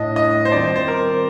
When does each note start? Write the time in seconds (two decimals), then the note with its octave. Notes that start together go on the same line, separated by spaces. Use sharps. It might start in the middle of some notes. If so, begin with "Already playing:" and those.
Already playing: A2 A3 D4 D#5
0.16 D#5
0.45 C5
0.52 D#3 G3 C4 F4 D5
0.64 C5
0.76 C5
0.88 A#4